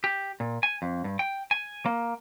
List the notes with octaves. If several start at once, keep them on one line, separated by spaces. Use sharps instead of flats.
G4
A#2
G#5
F2
G2
G5
G#5
A#3